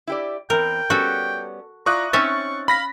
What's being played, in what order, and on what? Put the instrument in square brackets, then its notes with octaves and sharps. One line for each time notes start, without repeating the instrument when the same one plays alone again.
[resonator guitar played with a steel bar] E4 G4 D5
[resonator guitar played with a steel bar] E2 C4 [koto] A#4 [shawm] G5
[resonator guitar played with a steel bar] G3 B3 C#4 [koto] F#4 A4
[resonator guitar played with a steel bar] E4 F4 D5 [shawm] A#5 [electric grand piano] C#6 D#6 F#6
[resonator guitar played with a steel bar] C4 D#4 C#5 [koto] C#4 E5 [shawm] C#6 [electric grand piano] A6
[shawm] F5 [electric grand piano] B5 A#6 B6